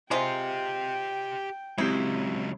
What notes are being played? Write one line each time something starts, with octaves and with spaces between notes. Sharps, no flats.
C3 G#3 F4 G4 G5 C6
C#2 F#3 G#3 C4 E4 G4